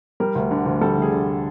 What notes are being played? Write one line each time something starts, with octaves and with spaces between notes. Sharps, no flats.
G3 A#4
D2
D3
D2
G3 A4
D2 G#4
D3